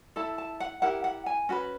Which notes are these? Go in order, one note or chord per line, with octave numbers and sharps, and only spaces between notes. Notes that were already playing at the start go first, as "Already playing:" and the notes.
E4 A4 A5
A5
F#5
E4 G4 A#4 F#5
F#5
G#5
C#4 F#4 B4